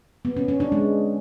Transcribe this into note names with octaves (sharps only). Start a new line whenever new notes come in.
B3
C#4
C#4
D4
G#3